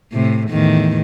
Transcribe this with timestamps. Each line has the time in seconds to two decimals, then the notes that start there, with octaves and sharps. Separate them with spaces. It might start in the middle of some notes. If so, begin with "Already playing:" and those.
0.12 A2 C3
0.50 E2 A2 D#3